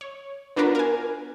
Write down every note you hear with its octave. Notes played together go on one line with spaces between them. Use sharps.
C#5
B3 D4 F4 F#4 A#4 B4
A#4 G#5